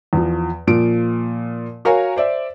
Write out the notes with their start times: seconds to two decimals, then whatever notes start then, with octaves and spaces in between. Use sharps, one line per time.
0.13 E2 F3
0.67 A#2 F3 D7
1.85 F#4 A#4 C#5 F5 G#5
2.16 C5 D5 E5